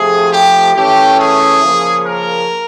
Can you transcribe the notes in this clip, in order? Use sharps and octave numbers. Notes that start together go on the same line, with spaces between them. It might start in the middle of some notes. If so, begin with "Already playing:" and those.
Already playing: C3 F3 A3 G#4
G4
E3 A3 C#4 G4
G#4
C#3 F3 A#3 C#4
A#4